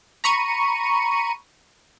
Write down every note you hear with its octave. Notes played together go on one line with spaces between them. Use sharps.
A#5 B5 C#6 C#7 D#7